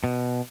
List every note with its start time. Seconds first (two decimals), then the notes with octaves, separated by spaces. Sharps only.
0.04 B2